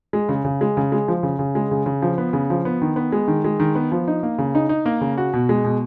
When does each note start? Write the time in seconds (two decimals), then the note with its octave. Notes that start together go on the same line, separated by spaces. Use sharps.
0.13 G#3
0.29 C#3
0.45 C#3
0.61 G#3
0.77 C#3
0.92 G#3
1.08 F3
1.23 C#3
1.39 C#3
1.55 G#3
1.71 C#3
1.86 C#3
2.02 F3
2.18 B3
2.33 C#3
2.50 F3
2.65 B3
2.82 D#3
2.96 B3
3.12 G#3
3.28 D#3
3.44 G#3
3.60 D#3
3.75 B3
3.92 F3
4.08 D#4
4.23 A#3
4.39 C#3
4.55 D#4
4.69 D#4
4.86 A#3
5.01 C#3
5.18 F#4
5.33 B2
5.49 G#3
5.65 B2